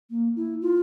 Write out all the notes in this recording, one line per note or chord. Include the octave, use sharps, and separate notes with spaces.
A#3
E4
F4